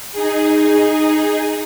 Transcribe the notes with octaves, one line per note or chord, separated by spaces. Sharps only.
D#4 G#4